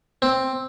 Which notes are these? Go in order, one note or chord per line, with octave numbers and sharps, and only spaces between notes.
C4